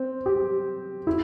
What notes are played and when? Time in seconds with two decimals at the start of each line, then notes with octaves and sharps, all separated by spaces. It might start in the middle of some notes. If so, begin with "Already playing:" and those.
Already playing: C4
0.26 G4
1.07 E4